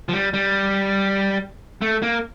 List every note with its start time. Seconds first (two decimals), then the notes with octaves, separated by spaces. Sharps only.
0.09 F3
0.13 G3
0.34 G3
1.82 A3
2.02 A#3